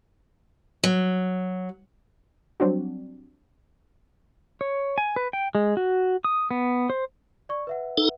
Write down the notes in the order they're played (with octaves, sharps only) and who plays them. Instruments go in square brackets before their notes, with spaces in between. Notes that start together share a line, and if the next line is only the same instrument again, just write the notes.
[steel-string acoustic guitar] F#3
[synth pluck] F#3 G3 C4 D4 F#4
[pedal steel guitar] C#5
G#5
B4
G5
G#3
F#4
D#6
B3
C5
[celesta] D5 C#6
B4 E5 F#5
[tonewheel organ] D#4 A4